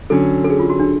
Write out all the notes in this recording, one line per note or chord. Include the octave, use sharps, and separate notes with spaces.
D3 F#3 C#4 A4
A4
G#4
F4
F#4
D4